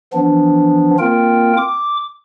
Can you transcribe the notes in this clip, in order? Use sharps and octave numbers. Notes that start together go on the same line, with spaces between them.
E3 F3 B3 D4
A#3 C4 F4 A#4 G5
D6